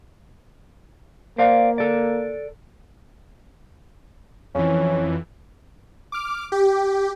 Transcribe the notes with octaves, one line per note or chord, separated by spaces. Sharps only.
A#3 C5 D5 F5
A4 D5
F2 E3 C#4
D6 F6
G4